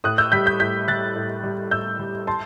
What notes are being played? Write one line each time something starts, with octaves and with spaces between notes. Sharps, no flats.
A2 D#6 F#6
E6 G6
G3 G6 B6
G6 B6
A2 G6 B6
G3 F#6 A6
A2
G3
A2 E6 G6
G3
A5 C6